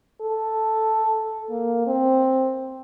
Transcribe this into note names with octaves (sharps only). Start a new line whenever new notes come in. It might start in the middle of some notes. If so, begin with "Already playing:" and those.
A4
A#3
C4